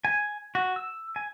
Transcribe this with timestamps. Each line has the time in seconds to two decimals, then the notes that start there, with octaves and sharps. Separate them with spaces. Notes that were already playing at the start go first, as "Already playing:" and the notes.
0.05 G#5
0.55 F#4
0.76 E6
1.16 G#5